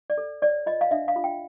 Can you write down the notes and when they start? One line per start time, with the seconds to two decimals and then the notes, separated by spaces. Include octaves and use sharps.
0.10 D5
0.18 A4
0.42 C#5 D5
0.66 F4 D#5
0.81 F5
0.91 D4 E5
1.08 F5
1.16 F4
1.24 G5